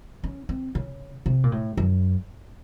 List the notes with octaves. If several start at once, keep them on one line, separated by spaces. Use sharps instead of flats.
C#4
C4
C#3
C3
A#2
A2
F#2